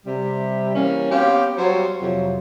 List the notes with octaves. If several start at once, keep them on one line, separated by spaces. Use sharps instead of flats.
C3 G3
E3 G3 A#3 C#4
B3 C4 F#4 G4 C#5 F5
F#3 G3 C5 C#5
F2 C3 F#3